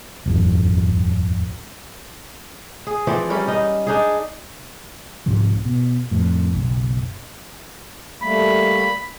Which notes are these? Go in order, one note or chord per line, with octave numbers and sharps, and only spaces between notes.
D#1 G#1 F2
G#4
E3 F3 C4 D5
G3 C#4 E4 A#4
D#4 D#5
D4 D#4 G#4
C2 G#2 C3 F3
B2
F2 A2
F#1 B1
G3 A3 A#3 B5